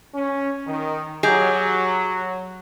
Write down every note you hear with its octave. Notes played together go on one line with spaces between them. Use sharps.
C#4
D#3
F#3 G4 G#4 D#5